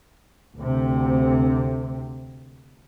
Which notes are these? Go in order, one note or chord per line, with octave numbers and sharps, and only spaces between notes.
D2 C3